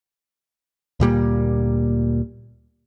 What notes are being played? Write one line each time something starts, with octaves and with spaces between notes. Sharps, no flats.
D2 A#2 G3 A#3